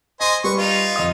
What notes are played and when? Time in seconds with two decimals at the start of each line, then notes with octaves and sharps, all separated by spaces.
0.21 C5 D#5 G#5 C6
0.44 G3 B4 C#6
0.58 D#4 F4
0.96 F2 D#5 D#6